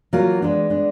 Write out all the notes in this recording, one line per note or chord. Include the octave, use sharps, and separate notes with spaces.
F#3 A#3 F4 A#4
G#3 B3 D4
G#3 B3 D4